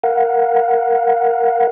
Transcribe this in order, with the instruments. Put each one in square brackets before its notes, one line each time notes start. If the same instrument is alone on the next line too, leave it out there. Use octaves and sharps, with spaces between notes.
[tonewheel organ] A#4 F5 F#5